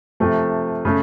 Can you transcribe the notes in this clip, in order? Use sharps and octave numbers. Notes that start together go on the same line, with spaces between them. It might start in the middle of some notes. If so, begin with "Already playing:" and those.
C3 F3 A3
C#3 A3